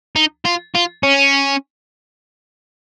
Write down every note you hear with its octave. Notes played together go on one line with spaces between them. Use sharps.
D#4
F4
F4
C#4